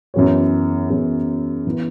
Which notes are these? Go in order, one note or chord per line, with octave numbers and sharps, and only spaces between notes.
F#2 E3 B3 G#4 C#5
F#2 E3 B3 G#4 C#5
E3 B3 E4 B4